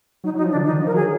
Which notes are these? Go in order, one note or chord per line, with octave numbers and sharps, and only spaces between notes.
F#3 D#4
F#3
D#4
F3
D4
D3
D#3 D#4
F3
A#4
F#3 G#4